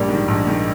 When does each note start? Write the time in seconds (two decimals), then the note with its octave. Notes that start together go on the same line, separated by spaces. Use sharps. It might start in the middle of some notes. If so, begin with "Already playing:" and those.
Already playing: A#1 G3 A#3
0.09 G#2 D#3
0.28 A#1
0.47 G#2 D#3